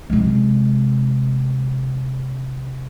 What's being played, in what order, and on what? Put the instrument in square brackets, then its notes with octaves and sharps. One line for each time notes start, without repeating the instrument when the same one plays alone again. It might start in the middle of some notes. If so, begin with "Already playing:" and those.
[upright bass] C3 G#3